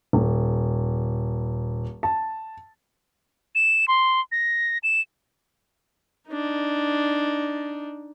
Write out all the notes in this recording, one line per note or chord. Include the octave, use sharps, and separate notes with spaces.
D#1
A5
E7
C6
A#6
E7
D4 D#4